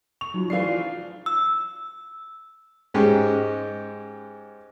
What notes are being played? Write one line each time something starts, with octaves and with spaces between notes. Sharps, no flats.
C#6 F7
F#3 D#4 F4 F#4
E3 F3 D5 F5 C7
E6
G#2 G#3 C#4 G4